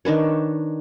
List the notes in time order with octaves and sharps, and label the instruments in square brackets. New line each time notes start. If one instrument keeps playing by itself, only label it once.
[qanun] D#3 D4 B4 C#5